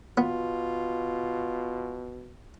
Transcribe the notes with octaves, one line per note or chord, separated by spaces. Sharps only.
B2 B3 F4